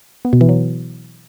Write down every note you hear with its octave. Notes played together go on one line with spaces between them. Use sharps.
B3
B2
E3
F#3